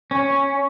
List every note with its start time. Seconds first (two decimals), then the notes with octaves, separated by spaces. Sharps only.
0.11 C#4